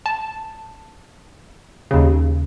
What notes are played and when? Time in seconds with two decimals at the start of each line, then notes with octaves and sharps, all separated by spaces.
0.06 A5
1.91 D#2 C#3